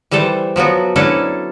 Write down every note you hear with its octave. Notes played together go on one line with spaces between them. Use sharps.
E3 G3 A3 A4 C5
F3 F#3 B3 F#4
F#3 C#4 D4 E4 F#4 A4